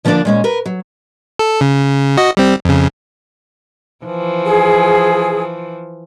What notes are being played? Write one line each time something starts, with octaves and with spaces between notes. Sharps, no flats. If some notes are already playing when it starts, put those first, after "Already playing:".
D3 F3 A#3 C#4 D4 D5
A#2 G#3 C#4
A#4 B4
F#3
A4
C#3
F#4 D#5
G3 C4
F2 C#3
E3 F3
G#4